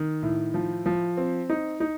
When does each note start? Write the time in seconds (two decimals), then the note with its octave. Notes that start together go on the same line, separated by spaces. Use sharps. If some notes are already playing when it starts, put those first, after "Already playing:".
Already playing: D#3
0.23 A2
0.54 F3
0.86 F3
1.17 C4
1.50 D#4
1.80 D#4